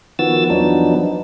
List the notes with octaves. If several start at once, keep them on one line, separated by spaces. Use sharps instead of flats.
D#3 F3 B3 F#4 E6 A6
E2 F3 F#3 B3 D4 D#4